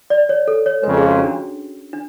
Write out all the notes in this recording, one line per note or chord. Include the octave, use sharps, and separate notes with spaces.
D5
C#5
A4
C#5
F2 C#3 G#3 B4
G#4
F#4
C#4
D4
D4